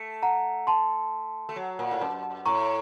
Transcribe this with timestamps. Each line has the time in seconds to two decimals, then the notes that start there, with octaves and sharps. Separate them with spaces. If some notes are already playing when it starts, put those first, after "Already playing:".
Already playing: A3
0.23 F#5 A#5
0.67 A5 C6
1.49 A3
1.56 F#3
1.79 A#2
1.91 A2
2.01 F#2
2.46 A2 A#5 C#6